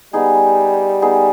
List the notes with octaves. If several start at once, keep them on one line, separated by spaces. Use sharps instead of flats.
G3 B3 D#4 G#4
B3 D#4 G#4